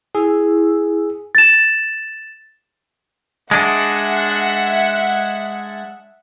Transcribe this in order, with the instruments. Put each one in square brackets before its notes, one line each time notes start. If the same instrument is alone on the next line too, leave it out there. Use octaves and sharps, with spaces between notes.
[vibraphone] E4 E6 [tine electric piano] G#4
[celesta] A6 E7
[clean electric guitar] G#3 D4 [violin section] E5 F#5